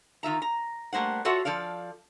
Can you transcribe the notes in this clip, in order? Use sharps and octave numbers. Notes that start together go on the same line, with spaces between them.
D#3 F4 E5 A#5
A#5
G3 A3 A#3 C5 F#5
F4 F#4 A4 C#5 E5 F#5
F3 A4 D5 F5